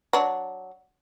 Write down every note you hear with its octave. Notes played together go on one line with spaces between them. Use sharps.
F#3 D4